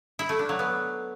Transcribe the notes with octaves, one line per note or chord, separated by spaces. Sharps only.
E4
A3
D4
F#3
B3